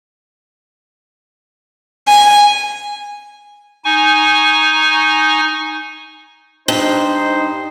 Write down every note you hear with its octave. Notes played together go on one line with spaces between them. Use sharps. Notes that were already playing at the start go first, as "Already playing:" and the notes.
G#5
D#4 G#5 C#6
G2 D#4 C5